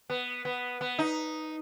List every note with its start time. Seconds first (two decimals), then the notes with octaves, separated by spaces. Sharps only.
0.10 B3
0.45 B3
0.81 B3
0.99 D#4